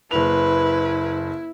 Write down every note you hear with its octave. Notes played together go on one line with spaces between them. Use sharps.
F#1 E4 B4 F7